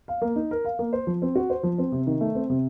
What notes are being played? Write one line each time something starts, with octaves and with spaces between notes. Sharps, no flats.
F5
A#3
D#4
A#4
F5
A#3
C5
F3
C4
F#4
C5
F3
C4
C3
D#3
A3
C4
C3